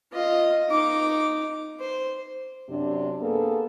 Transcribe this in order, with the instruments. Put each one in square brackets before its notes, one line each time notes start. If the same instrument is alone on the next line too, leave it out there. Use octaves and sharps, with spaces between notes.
[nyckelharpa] F4 D#5
D#4 D6
C5
[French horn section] F#2 C3 D4
A#3 B3 G#4 A4